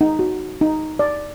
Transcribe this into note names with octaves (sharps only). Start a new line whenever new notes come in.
D#4
F#4
D#4
D5